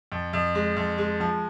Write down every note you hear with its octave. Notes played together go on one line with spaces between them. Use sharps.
F2
F2
G#3
F2
G#3
F3